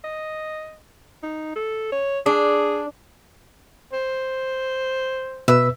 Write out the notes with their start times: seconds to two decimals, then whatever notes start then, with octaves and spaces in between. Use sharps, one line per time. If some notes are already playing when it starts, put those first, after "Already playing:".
0.04 D#5
1.23 D#4
1.56 A4
1.92 C#5
2.26 D4 G#4
3.93 C5
5.48 B2 B4 E5 E6